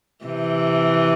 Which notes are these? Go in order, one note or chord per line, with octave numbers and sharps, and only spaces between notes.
C3 E3